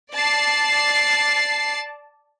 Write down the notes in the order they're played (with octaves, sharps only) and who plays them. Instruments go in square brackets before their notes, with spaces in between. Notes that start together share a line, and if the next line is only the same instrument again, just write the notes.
[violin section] D5 A5 A6 C7